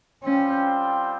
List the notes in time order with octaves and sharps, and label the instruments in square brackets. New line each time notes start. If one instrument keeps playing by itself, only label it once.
[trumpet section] G3 C4 F4 C5 G5 [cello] C#4